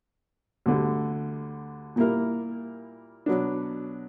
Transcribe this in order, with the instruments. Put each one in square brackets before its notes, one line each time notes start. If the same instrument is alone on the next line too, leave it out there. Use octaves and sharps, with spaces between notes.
[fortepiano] D2 D3 G3
A#2 G3 A#3 E4 A#4
B2 F#3 B3 D4